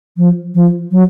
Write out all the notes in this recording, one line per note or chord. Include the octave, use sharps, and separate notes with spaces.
F3
F3
F#3